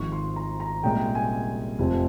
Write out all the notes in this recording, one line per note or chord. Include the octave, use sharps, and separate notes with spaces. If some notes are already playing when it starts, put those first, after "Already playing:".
Already playing: G#1 G#2 F3 C#6
C6
A#5
A#5
C2 A#2 G#3 C#4 G5
G#5
F1 F2 C3 F3 C4